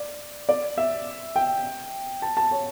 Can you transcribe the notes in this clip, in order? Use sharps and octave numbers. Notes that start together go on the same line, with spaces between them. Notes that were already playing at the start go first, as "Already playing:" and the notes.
Already playing: D5
D5
E5
G5
A5
A5
C#5